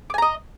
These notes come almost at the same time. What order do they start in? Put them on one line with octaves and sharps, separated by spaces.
D6 G#5 A#5 D#5